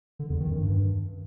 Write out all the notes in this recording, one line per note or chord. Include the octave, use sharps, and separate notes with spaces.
D3
E2
D#3
F#2
G2